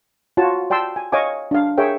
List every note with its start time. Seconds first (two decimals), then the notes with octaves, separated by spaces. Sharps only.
0.37 F4 F#4 C#5 A5
0.70 D5 G5 A5 C6 E6
0.96 G#5
1.12 C#5 D#5 F5 G#5 D6
1.51 D4 F5
1.78 G#4 A#4 C#5 E5 G5